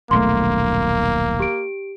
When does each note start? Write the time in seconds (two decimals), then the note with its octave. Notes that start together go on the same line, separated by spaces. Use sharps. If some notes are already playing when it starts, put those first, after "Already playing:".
0.11 D#1 B1 A3 A#3 C6
1.40 G4 D7